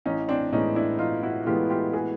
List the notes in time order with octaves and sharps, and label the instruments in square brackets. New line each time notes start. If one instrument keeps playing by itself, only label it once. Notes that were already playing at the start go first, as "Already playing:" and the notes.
[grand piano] A1 [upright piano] C#4 D#4
[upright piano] C4 D4
[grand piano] A2 E3 G#3 B3 [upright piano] C#4 D#4
[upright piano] D4 E4
[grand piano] A1 [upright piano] D#4 F4
[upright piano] E4 F#4
F#4
[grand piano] A2 E3 G#3 B3 [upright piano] F4 G4
[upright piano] F4 G4
F#4 G#4